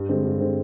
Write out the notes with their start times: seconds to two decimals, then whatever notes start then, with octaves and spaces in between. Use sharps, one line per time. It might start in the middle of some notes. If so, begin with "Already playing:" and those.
Already playing: G2
0.09 D3 G#3 C4
0.25 G2
0.41 D3 G#3 C4